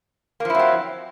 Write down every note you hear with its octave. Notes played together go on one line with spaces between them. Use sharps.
F3 F#3 A#3 C4 E4